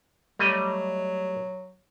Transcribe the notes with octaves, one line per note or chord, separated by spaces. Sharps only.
F#3 G3 A3 D#5